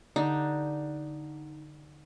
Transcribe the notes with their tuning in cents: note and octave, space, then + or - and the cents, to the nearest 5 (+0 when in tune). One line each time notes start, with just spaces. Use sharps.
D3 +0 D#4 +0 G4 +0